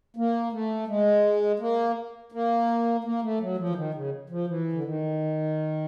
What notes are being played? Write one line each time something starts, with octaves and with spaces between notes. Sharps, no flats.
A#3
A3
G#3
A#3
A#3
A#3
A3
F#3
F3
E3
D#3
C#3
F3
E3
D3
D#3